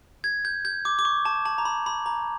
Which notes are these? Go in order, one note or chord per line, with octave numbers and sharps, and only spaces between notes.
G#6
G6
G6
D6
D6
C#6
A5
A5
A#5
B5
B5
A#5